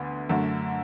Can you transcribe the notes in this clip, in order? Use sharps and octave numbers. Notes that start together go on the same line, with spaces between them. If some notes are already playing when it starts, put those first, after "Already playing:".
Already playing: D2 D3 B3
F#2 D3 A3